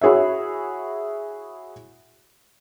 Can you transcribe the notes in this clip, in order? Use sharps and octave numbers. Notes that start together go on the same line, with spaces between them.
E4 F#4 G#4 C#5 E5